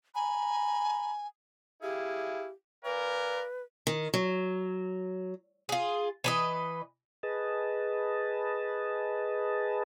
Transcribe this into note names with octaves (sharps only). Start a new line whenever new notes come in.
G#5 A#5 B5
E4 G4 G#4 F5
A#4 B4 D5 F5 G#5
D#3
F#3
F4 G#4
E3 B4 D#5
G#4 B4 D#5 A5